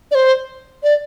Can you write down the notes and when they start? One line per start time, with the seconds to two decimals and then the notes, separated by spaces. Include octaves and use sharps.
0.11 D5
0.15 C5
0.83 D5